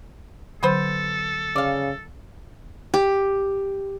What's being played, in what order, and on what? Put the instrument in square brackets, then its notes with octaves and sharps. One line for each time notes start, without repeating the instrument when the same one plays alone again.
[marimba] D3 F#3 [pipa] B3 B4 C5 [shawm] A4
[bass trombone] C#3 [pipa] D5 F5
[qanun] G4